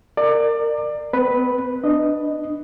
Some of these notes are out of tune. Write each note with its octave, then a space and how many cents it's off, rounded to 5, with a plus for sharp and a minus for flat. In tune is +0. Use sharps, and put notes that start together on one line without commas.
A#4 -20 D5 +25
C4 -40 B4 +0
D4 +20 D#5 +0